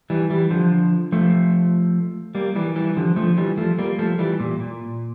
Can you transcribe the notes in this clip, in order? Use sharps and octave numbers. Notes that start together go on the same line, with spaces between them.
E3 G3
E3 G3
D3 F3
F3 A3
G3 A#3
E3 G3
E3 G3
D3 F3
F3 A3
E3 G3
F3 A3
G3 A#3
F3 A3
E3 G3
A#2
A#2